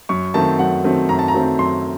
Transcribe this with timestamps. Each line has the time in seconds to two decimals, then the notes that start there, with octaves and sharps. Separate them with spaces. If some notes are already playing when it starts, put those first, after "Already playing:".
0.09 F#2 C#6
0.34 D#3 F#3 A3 C4 A5
0.59 F#2 F#5
0.84 D#3 F#3 A3 C4
1.09 F#2 A#5
1.19 A5
1.28 A#5
1.34 D#3 F#3 A3 C4
1.59 F#2 C6